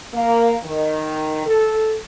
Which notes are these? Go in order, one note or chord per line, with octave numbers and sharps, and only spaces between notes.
A#3
D#3
A4